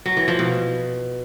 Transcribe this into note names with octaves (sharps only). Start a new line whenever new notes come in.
F#3
E3
F3
B2